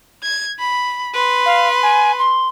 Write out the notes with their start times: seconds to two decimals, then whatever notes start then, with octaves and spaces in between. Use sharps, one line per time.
0.23 G#6
0.59 B5
1.14 B4 C6
1.45 F5
1.83 G#5
2.19 C6